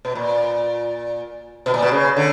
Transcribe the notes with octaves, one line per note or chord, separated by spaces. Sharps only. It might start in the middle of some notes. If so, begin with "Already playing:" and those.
B2
A#2
B2
A#2
B2
C#3
D3